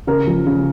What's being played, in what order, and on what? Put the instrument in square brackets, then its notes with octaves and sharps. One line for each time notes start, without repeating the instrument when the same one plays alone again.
[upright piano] C#3 A#4
F3
C#3